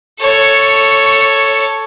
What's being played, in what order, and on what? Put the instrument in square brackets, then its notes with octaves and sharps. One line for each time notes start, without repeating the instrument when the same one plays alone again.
[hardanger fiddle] A4 C#5